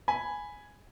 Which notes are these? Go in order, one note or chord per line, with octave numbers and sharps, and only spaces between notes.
G#5 B5